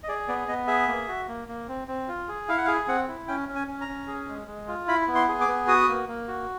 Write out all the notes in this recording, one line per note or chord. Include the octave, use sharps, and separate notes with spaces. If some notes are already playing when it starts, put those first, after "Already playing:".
D#5
G#4 D5
B3 D5
B3 D#5
G#4 E5
A#3
F#4
A#3
A#3
C4
C4
F4
G#4
E4 F5
F#5
G#4 F5
C4 F#5
E4
C#4 G5
C#4
G#5
C#4
A#5
C#4
G#4
G#3
G#3
F4
E4 B5
B3
C6
G#4
D6
B3
F#4 D#6
A#3
A#3
F#4